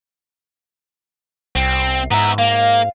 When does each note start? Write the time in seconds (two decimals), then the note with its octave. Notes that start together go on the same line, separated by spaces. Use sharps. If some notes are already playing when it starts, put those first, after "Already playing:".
1.56 C2 C4
2.11 G#2 B3 E5 A#5
2.38 A#3 F5